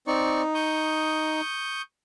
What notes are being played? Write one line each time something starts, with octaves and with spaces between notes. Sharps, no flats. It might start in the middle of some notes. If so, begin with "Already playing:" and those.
C4 D#4 D5 C#6
C#6 D#6 G6